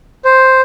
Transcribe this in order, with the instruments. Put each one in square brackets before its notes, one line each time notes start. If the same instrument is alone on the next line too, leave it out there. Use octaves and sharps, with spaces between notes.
[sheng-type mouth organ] C5